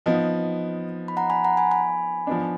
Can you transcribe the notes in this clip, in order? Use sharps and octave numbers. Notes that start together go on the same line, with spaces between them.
F3 B3 D#4
B5
F#5 A#5
G#5 B5
F#5 A#5
G#5 B5
G#5 B5
F3 B3 D4